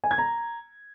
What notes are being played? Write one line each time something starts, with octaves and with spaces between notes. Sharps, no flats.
G#5
G#6
A#5